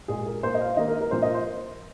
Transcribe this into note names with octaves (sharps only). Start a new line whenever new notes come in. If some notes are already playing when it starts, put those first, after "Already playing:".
A#2 G#3 G#4
A#4
A#2 A#3 C5
D#5
F5
D#3 A#3 D#5
A#4
A#4
A#2 F3 A#3 C5
D#5
C5